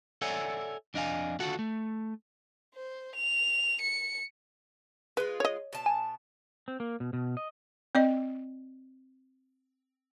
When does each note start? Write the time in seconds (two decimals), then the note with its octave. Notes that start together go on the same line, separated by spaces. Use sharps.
0.22 A4 C#5 D5 E5 F#5 G#5
0.94 F2 D4 D#5 F5 G#5
1.40 D3 D#3 F4 F#4 A4 F#5
1.59 A3
2.75 C5
3.15 F7
3.81 C#7
5.17 G#3 F4 B4
5.40 C#5 D#5
5.73 B2 A5
5.86 G#5
6.68 C4
6.80 A#3
7.00 B2
7.13 B2
7.37 D#5
7.95 C4 D5 D#5